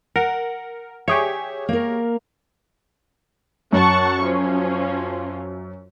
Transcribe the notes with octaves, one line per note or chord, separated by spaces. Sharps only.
A#4 F#5
G4 G#4 C#5 E5
A#3 A#4
F#2 F#5 A5 C#6
F3 C#4